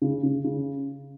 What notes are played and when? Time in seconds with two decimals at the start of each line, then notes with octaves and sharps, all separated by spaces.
0.01 C#3
0.23 C#3
0.44 C#3